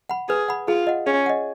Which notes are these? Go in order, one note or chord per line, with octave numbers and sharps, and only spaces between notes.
F#5 B5
G#4 B4
F#5 B5
F4 G#4
D#5 F#5
C#4 G#4
D#5 F#5